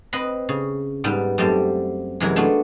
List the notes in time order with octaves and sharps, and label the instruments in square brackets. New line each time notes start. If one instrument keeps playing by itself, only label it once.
[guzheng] C4 B4 D#5 B5
C#3
G#2 G3 B3 G5
F#2 G3 A3 C4 G4 A5
F#2 C3 E3 G#3 A#4 B4
A3 B3 D4 F4 F#4